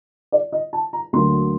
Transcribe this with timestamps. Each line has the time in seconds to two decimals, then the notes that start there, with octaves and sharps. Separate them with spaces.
0.32 D5
0.52 D#5
0.73 A5
0.93 A#5
1.13 D2 D3 F#3 A#3 C6